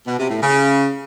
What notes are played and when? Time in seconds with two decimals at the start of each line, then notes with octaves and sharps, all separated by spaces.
0.06 B2
0.18 C3
0.30 A2
0.41 C#3